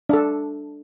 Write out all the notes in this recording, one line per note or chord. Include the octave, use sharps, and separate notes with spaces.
D4 A4